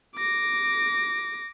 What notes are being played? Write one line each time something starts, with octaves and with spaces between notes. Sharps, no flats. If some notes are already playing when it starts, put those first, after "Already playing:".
D6 A#6